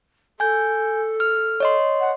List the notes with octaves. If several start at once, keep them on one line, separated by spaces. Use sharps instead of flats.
A4 G#5 G6
F6
C#5 D#5 C6
F#5